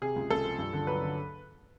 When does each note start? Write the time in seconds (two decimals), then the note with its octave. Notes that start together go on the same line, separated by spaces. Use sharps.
0.02 C3 G#4
0.16 C#2
0.30 C#2 A4
0.45 F3
0.58 G2
0.73 D3
0.87 F#3 B4
1.01 D3